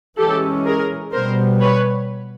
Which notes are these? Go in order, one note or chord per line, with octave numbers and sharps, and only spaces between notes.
E3 G#3 C#4 G4 A4
G#4 A#4
B2 G3 B3 A#4 C5
B4 C#5